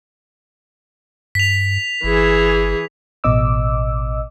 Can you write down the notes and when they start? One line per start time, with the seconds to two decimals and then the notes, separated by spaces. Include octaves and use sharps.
1.35 G2 B6 F7
2.04 G1 E3 G#4
3.24 A1 B2 D#5 D6 E6